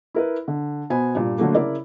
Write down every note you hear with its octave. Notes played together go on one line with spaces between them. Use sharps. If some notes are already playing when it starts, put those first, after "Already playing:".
E4 A#4 B4
D3
B2 B3 C5 G#5 B5
G2 A#2
D3 F#3 A3 A#3
C#3 E4 A#4 D5